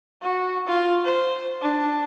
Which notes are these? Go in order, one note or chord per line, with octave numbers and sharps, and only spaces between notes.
F#4
F4
C5
D4